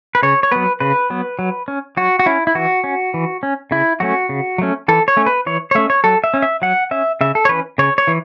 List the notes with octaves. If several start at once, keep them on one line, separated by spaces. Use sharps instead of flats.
B4
C#3 C#5
C#5
F#3 B3 B4
C#3 B4
F#3 B3
F#3
C#4
F#3 F#4
F#4
C#4 E4
E4
E3 F#4
C#4
E3
C#4
C#3 E4
F#3 A3 C#4 F#4
C#3
F#3 A3 C#4
E3 A4
C#5
A3 C#4
B4
E3 C#5
C#5
A3 C#4 E5
C#5
F#3 A4
E5
C#4
E5
F#3 F#5
C#4 E5
C#3 E5
A4
C#5
E3 C#4 B4
C#3 C#5
C#5
E3